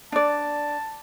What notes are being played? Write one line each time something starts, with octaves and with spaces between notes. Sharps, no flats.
D4 D5 A5